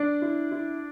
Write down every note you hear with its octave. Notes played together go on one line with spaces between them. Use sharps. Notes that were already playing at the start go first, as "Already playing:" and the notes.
Already playing: D4 D5
E4
E4